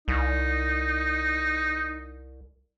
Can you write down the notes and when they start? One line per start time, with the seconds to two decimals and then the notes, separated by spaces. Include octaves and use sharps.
0.08 C2 D#4